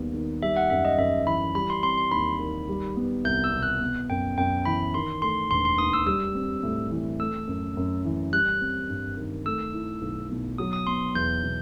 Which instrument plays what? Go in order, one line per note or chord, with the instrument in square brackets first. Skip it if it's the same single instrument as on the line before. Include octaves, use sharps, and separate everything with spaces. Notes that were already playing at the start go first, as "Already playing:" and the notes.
Already playing: [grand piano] D#2 G3 B3
D#3
[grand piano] G3 [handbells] E5
[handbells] F#5
[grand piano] F#2 [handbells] E5
[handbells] D#5
[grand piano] F#2 [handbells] E5
[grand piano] E3 [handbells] B5
[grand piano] G3 [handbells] B5
[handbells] C6
[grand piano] C4 [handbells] C6
[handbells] C6
[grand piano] D#2 [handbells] B5
[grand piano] D#3
G3
B3
[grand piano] C2 [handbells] G6
[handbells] E6
[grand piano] B2
[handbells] F#6
[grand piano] B3
[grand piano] F#2 [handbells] G5
[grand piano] F#2 [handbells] G5
[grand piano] E3 [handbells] B5
[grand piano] D#3 [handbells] C6
[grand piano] A3 [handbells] C6
[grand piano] E1 [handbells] C6
[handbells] C6
[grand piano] D#2 [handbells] D#6
[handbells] E6
[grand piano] G3 [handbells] E6
[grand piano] C4
A2
E3
[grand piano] A3 [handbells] E6
[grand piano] F#2
F#2
E3
[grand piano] G3 [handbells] F#6
[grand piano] C4
G2
D#3
[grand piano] A3 [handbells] E6
[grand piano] E4
B1
B2
[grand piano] F#3 [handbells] D#6
[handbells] D#6
[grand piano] B3 [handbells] C6
[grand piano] E2 [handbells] G6
[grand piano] B2